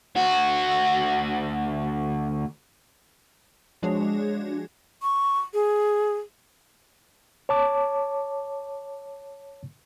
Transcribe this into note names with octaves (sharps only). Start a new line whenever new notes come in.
D2 F#4
F3 G#3 D4 F#4 G#4 C#5
C#6
G#4
C#5 A5 D6